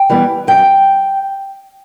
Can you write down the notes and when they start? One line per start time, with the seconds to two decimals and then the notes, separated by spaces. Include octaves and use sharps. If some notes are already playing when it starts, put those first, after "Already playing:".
Already playing: G5
0.10 E3 G3 B3
0.47 F#2 G5